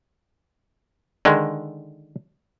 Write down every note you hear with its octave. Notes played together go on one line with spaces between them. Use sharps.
D3 D#3 G#3